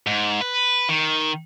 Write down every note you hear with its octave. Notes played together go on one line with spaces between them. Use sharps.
G#2
B4
D#3